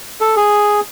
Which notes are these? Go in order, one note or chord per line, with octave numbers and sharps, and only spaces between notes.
A4
G#4